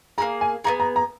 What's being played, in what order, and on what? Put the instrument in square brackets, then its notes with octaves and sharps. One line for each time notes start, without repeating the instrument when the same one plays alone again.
[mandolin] A#3 E4 G#4 [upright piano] A#5
[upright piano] G#5
[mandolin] B3 D#4 G#4 [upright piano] A#5
[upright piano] A#5
A#5